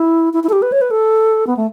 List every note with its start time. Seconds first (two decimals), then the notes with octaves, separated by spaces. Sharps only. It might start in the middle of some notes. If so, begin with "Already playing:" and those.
Already playing: E4
0.33 E4
0.44 E4
0.49 A4
0.53 G4
0.62 B4
0.72 C#5
0.81 B4
0.91 A4
1.47 B3
1.57 A3